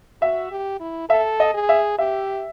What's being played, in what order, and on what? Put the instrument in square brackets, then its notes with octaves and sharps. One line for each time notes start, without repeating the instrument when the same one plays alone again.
[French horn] F#4 [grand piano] E5
[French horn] G4
E4
[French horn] A4 [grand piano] E5
[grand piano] D#5
[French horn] G#4
[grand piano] E5
[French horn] G4 [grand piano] E5